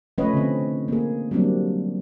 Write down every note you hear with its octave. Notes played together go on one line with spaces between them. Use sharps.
F3 A3 C#4 B4 C#5 D#5
D3 C4
A#3 G#4
F#3 G3 A#3 C4 D4